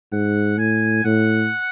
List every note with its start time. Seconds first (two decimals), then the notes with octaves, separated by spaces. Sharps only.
0.12 G#2 F#5
0.59 A2 G#5
1.05 A2 F#5